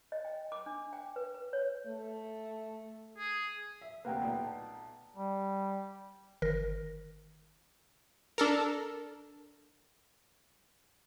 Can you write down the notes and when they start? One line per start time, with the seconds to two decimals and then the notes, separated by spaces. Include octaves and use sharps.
0.12 D#5
0.25 G5
0.52 D6
0.66 D4
0.93 G5
1.16 B4
1.34 B4
1.53 C#5
1.86 A3
3.18 G#4
3.81 E5
4.05 D2 C3 A#3 B4 F#5 G5
4.21 B1 A#2
4.44 A5
5.17 G3
6.42 G1 D#3 A#4 A#6
8.38 D4 A4 A#4